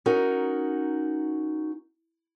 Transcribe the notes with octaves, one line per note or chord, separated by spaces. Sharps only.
C#4 D#4 F#4 A#4